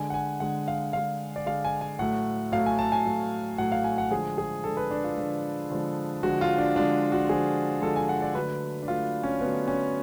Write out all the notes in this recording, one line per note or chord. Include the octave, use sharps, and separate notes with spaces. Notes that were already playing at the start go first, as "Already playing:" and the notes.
Already playing: D3 G#3 G#5
F#5
G#5
D3 G#3 F#5
F5
D3 G#3 F5
D5
D3 G#3 F5
G#5
G#5
A2 F#3 A3 F#5
A2 F#3 A3 F5
G#5
A5
G#5
A2 F#3 A3
A2 F#3 A3 F#5
F5
G#5
F#5
D3 F3 G#3 G#4
G#4
D3 F3 G#3 A4
B4
D4
F4
D3 F3 G#3
D3 F3 G#3
D3 F3 G#3 F#4
F4
D4
D3 F3 G#3 D4
F#4
D3 F3 G#3 G#4
D3 F3 G#3 A4
G#5
F#5
D5
D3 F#3 A3 B4
D4
D3 F#3 A3 F4
C#4
D3 F#3 A3 B3
C#4